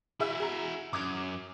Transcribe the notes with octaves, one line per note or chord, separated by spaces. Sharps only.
E4 F#4 G#4 E5 E6
G#4 A#5
F#2 D6 D#6 G#6